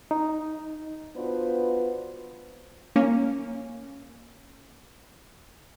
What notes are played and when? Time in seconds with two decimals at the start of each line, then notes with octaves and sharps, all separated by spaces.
0.11 D#4
1.16 B3 D4 F4 F#4 B4 C5
2.96 A#3 C#4